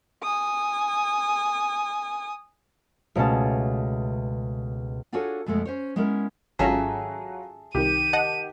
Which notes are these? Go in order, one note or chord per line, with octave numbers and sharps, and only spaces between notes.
G#5 D#6
C#2 B2 A3 C#4 A5
D4 F4 F#4 G#4 A4 C#5
F2 B2 G#3 A3
C#4 C5 C#5
G#3 B3 C#4 E4 A#4
G#1 F#3 C#4 F4 G#4 A4 E5 A#5
C2 D#3 G4 D#7
D#5 F#5 A5